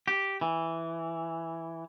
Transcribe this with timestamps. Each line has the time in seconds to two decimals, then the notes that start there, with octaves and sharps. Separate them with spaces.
0.08 G4
0.41 E3